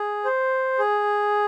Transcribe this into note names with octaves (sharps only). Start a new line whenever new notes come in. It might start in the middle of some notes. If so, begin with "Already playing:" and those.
Already playing: G#4
C5
G#4